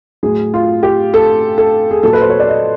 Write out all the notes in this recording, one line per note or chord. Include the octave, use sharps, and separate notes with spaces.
A2 F#3 G#4
F4
G4
A4
A4
G#4
A#2 F#3 A4
B4
C5
C#5
D5
D#5